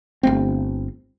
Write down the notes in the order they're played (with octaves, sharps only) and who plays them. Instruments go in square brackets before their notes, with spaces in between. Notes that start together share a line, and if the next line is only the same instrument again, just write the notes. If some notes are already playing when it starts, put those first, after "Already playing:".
[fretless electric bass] G1 A3 C4